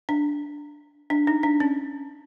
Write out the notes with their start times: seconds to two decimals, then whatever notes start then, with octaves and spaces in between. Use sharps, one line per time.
0.09 D4
1.10 D4
1.27 D#4
1.43 D4
1.60 C#4